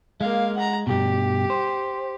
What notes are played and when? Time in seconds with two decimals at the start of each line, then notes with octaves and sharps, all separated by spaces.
0.21 G#3 A#3 F5
0.57 F#5 A#5
0.87 G2 B2 G4
1.50 C5